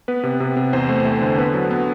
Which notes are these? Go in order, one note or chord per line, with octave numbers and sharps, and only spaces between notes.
B3 B4
C3
C3
C3
E2 C5
A3
A3
D3
B3 B4
F#3
B3